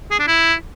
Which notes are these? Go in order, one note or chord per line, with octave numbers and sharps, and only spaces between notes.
G#4
D4
E4